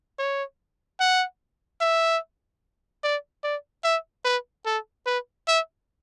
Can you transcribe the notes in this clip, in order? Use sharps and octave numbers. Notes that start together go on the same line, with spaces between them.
C#5
F#5
E5
D5
D5
E5
B4
A4
B4
E5